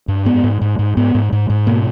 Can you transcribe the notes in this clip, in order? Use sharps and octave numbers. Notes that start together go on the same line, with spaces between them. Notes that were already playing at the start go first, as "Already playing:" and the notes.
G2
G#2 B3
G#2
G#2
G#2
G#2 B3
G#2
G#2
G#2
B2 A#3